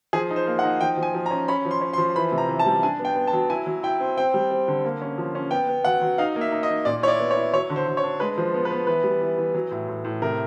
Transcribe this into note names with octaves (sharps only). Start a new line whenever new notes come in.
F3 G#4
D#4
C5
A#3
F#5
D#4
F3 G5
F3
G#5
F3
A#5
C#4
C#4 B5
F3
C6
C#4
C6
F3
E3 B5
C3
A#5
E3
A5
G3
D4 G#5
B3
G5
B3
A5
F#3
E4 G#5
F#3
E4 G5
C4
C4 G5
G3
C4
D3
A#3
C#4
F3
C#4
B3 G5
B3
F#3 F#5
F#3
D#4 F5
A#3
E5
D#4
D#5
D#4
A#2 D5
E4 C#5
D5
B3
C#5
E4
F#3 C#5
D3
C5
D3
C#5
D4
G#3 B4
F3
B3
B4
B3
E3 B4
G3
E3
E3
F#3
A2
A2
A2
C3 A#4